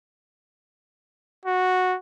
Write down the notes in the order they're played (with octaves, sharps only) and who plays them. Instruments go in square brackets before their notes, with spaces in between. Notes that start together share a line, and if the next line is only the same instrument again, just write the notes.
[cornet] F#4